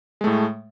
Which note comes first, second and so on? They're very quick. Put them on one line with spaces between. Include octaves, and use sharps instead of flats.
G#3 A3 A2